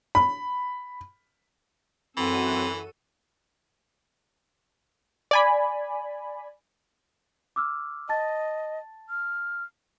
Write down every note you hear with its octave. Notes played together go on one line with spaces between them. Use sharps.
B5
F#2 E3 C4 F#4 A4 D#7
D5 G#5 B5
D6 E6 F6
D#5 A5 A6
F6